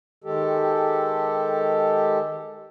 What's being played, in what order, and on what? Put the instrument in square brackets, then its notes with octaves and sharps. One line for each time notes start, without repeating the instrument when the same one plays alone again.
[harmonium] D#3 G#3 G4 A4